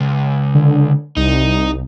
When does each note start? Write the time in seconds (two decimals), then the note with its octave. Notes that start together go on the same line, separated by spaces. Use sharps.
0.01 C#2
0.55 D3
1.17 C2 D#4
1.47 C2